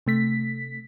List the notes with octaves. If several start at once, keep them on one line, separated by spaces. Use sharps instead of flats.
C3 A3 B6